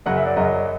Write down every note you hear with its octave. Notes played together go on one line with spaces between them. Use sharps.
F#2 C#3 F#3 F#5
E5
D5
F#2 C#3 F#3 D#5